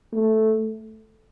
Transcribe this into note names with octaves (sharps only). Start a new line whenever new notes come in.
A3